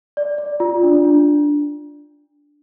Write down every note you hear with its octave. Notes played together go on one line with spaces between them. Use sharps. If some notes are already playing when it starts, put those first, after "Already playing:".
D5
D5
F4
D4
D4